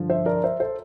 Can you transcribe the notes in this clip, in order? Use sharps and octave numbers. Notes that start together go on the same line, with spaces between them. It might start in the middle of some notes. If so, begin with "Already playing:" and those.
Already playing: G2 D3 F3
C5 E5
A#4 D5
C5 E5
A4 C5